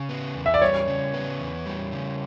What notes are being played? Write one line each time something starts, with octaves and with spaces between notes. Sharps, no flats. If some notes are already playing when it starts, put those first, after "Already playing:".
Already playing: C#3
B3
E2
E5
D5
G3 C#5
C#3
B3
E2
G3
C#3